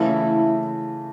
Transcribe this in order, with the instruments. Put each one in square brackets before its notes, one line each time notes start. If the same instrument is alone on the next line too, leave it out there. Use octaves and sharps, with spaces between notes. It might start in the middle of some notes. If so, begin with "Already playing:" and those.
Already playing: [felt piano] C#3 E3 A3 [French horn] E4